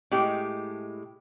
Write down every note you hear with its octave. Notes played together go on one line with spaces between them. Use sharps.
A2 G#3 G4